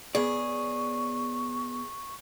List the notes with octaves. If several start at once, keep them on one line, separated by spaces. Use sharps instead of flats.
B3 G#4 C#5 D5 C#6